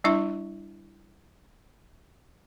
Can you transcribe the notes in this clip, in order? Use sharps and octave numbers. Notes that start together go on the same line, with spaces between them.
G3 D4 E4 E5 C#6